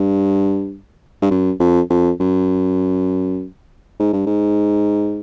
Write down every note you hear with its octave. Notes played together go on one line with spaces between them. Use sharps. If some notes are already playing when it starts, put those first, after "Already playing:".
Already playing: G2
G2
F#2
F2
F2
F#2
G#2
G2
G#2